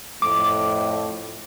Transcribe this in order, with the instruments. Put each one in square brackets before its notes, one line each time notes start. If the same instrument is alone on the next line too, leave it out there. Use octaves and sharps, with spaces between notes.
[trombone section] F2 A2 [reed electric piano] D6